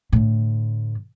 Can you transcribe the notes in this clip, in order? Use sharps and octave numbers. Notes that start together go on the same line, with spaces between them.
A2 D3